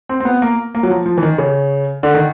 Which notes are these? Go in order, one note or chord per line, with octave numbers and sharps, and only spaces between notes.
C4
C4
B3
A#3
A#3
F#3
F3
F3
E3
D#3
C#3
D3
D#3